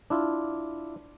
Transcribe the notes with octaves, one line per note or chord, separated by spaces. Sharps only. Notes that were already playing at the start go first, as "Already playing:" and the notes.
D4 E4 F4